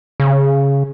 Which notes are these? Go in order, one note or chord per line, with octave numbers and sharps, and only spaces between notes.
C#3